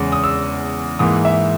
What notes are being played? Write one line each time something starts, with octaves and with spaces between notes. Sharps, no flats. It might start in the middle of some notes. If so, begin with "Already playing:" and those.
Already playing: E2 C#3 G#3
D#6
E6
G#2 E3 A#3 D#6
E5